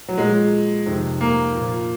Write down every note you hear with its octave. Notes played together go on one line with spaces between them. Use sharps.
F#3
A#2 F3 G#3
F2 C3 D#3
A#3
A#2 F3